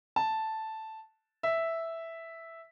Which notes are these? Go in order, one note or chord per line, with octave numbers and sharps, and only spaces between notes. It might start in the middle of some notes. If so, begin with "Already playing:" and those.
A5
E5